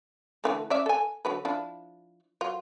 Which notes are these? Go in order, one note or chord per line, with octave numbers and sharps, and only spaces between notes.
D3 E3 A3
C#4 D5 E5
A4 G#5
D3 F#3 B4
F3 D4 E4
F#3 F4